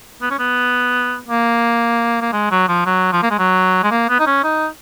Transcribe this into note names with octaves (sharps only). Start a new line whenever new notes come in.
B3
C#4
B3
A#3
A#3
G#3
F#3
F3
F#3
F3
A#3
G#3
F#3
G#3
A#3
B3
D#4
C#4
D#4